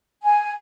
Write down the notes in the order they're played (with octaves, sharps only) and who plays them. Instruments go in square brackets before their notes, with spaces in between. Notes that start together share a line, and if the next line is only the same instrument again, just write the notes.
[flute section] G#5